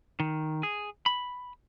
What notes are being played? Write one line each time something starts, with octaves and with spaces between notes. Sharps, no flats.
D#3
G#4
B5